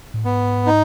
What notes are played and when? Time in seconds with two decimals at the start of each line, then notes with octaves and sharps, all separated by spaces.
0.14 A2
0.25 G#2 B3
0.66 D#4